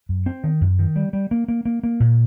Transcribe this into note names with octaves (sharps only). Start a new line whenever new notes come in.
F#2
C4
D#3
F#2
D#3
G3
G3
A#3
A#3
A#3
A#3
A#2